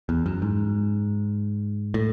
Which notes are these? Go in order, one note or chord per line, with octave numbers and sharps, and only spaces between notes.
E2
F#2
G#2
A2